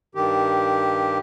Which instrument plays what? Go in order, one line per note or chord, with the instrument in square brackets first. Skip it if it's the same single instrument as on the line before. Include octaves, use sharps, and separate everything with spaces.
[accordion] G2 D#3 G4